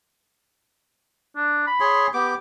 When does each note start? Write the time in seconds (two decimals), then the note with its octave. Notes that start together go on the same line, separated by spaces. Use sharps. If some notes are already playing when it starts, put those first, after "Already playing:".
1.36 D4
1.67 B5
1.80 G#4 C#5 C6
2.14 B3 G4 D6